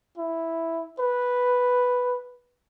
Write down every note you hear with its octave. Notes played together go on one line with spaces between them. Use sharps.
E4
B4